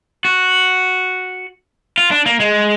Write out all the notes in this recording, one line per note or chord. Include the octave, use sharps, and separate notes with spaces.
F#4
F4
D4
A#3
G#3